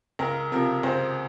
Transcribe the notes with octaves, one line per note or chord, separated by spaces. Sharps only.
C#2 A#4
C3 F3 A#4
C#2 C5